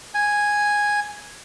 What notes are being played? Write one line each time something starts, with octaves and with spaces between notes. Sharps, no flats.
G#5